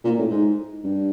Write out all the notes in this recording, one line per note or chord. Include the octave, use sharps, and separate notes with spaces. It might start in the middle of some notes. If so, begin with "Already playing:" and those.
A#2
A2
G#2
G2